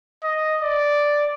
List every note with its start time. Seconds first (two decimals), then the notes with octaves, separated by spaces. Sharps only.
0.24 D#5
0.62 D5